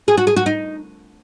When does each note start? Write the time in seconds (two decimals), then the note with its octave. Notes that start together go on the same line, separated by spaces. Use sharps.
0.08 G#4
0.17 F#4
0.27 G#4
0.36 F#4
0.46 D#4